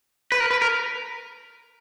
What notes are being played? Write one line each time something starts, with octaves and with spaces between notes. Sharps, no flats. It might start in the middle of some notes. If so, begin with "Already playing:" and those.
B4
A#4
B4
A#4